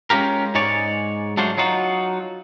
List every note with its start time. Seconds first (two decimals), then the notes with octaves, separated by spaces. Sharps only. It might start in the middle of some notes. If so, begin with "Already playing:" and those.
0.10 G#3 C#4 F4 G4 A#4
0.55 G#2 G#3 C#5 D5
1.37 F#3 A3 D4 F4 F#4 C5
1.58 F#3 D#4 F4 F#4